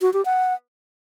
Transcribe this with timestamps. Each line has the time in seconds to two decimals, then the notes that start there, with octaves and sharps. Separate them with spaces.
0.02 F#4
0.13 G4
0.25 F#5